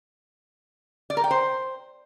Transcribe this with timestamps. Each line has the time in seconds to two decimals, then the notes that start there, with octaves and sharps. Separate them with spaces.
1.10 D5
1.17 A#4
1.24 G5
1.31 C5